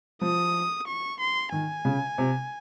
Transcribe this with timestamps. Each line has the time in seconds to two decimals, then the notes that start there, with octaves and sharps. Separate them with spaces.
0.21 F3 D#6
0.87 C#6
1.20 C6
1.52 D#3 G#5
1.85 C#3
2.18 C3